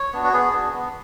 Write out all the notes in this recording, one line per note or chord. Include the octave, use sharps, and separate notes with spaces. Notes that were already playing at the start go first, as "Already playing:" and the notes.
Already playing: C#5
B3 D4 F#4
F#4
B3 G#4
D4 F#4
B3